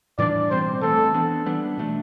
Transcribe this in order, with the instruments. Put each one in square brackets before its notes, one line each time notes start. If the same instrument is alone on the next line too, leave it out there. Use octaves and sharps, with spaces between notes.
[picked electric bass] A2 E3 G3 D4 [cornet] D5
[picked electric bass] B2 G3 C4 [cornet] C5
[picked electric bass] E3 A3 C4 [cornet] A4
[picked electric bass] E3 B3 D4
E3 G3 B3 D4
B2 A3 D4